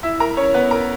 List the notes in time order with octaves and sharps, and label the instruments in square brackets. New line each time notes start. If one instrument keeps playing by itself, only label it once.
[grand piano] E4 E5
A#4 A#5
C#4 C#5
B3 B4
A#4 A#5